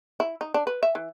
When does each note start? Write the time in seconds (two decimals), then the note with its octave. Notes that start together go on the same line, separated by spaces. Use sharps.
0.20 E4
0.41 D#4
0.54 D4
0.67 B4
0.83 E5
0.95 E3